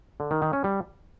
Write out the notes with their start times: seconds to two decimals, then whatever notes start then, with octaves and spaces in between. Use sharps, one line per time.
0.20 D3
0.31 D#3
0.42 D#3
0.53 C#4
0.64 G3